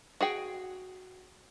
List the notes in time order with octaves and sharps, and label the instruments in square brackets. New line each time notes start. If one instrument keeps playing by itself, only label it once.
[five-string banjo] F#4 G#4 G5